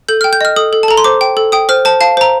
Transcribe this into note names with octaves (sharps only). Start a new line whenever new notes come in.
A4 G6
F6
G5
G6
D#5 F6
A4 D#6
A4
A5
A4 A#5
C6
C5 D6
G5
A4
G5 D#6
C5 F6
C5 A5
F5 A5
C5 A#5